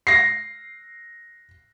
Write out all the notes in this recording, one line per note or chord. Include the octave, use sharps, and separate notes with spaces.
A#6 C7